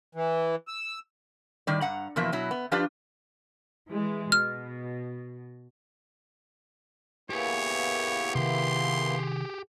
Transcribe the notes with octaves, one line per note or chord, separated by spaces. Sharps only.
E3
E6
A2 D#3 G3 D5
G2 F#5 A#5
E2 B2 F3 A#3 E4
B2 F#3 E4
B3
F3 D4 F4 G4 B4 D5
E3 G#3
B2 F6
A#3 B3 E4 G4 G#4 C#5
C3 D#3 C6